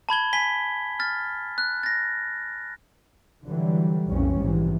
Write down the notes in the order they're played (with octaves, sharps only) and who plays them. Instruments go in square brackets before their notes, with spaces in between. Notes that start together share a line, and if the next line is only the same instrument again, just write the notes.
[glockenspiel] A5 B5 G#6 G7
G#5 B6 G7
F6 A6
F#6
A6 A#6
[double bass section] D3 E3 F#3 G3
B1 F2 A#2 E3 G3 C#4
A#1 G#2 C3 E3